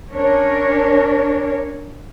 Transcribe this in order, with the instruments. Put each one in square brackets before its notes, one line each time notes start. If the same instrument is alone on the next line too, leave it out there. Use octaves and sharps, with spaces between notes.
[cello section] C#4 D4 A#4 C#5